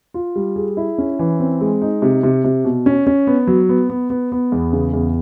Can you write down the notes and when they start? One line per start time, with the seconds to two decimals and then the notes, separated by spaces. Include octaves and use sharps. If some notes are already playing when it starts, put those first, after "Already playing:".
0.14 F4
0.36 G3
0.56 G#4
0.77 E4
0.98 C#4
1.19 E3
1.40 C4
1.61 G#3
1.82 D#4
2.02 C3
2.23 C3
2.45 C3
2.65 B2
2.86 C#4
3.07 C#4
3.27 B3
3.47 F#3
3.69 B3
3.90 B3
4.10 B3
4.32 B3
4.52 E2
4.73 C#3
4.93 E2